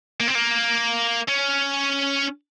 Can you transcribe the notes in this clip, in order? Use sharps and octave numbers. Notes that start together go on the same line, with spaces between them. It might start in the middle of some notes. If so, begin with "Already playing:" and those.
A#3
C4
A#3
C#4